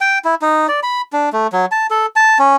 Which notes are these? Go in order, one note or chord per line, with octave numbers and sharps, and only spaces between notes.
G5
E4
D#4
D5
B5
D4
A3
F#3
A5
A4
A5
C#4